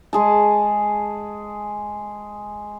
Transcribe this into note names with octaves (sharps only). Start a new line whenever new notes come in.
G#3 G#4 A5